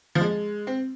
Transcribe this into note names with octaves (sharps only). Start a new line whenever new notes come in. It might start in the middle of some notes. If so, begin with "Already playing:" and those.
F3
G#3
C4